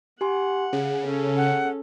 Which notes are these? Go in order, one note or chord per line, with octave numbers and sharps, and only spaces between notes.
G4 F#5 G#5 C6
C#3 G#4
C#4 A4
F#5